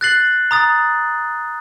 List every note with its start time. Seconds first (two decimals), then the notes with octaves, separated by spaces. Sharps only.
0.01 F#6 A6 C7 F#7
0.51 A#5 D#6 A6